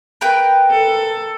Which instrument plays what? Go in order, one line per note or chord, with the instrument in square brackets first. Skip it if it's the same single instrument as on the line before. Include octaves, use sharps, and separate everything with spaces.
[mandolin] A#4 B4 G5
[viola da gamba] A4